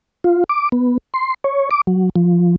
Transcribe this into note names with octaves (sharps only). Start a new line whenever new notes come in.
F4
D6
B3
C6
C#5
D6
F#3
F3